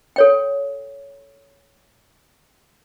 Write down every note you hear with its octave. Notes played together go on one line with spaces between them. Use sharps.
A4 C#5 G5